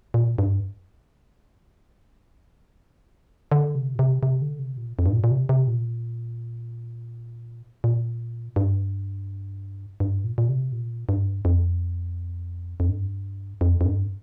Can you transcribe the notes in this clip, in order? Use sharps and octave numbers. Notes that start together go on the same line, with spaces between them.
A#2
G2
D3
C3
A#2
C3
C3
D3
C3
A#2
F2
G2
A#2
A#2
C3
C3
A#2
A#2
G2
G2
A#2
A#2
C3
A#2
G2
F2
F2
G2
F2
F2
G2